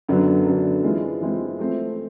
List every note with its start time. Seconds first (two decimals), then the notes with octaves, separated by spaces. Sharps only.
0.09 F#2 D3 F#3 B3 D4
0.46 F#2 D3 F#3 B3 D4
0.84 E3 G#3 C4 F4
1.21 E3 G#3 C4 F4
1.59 F3 A3 C4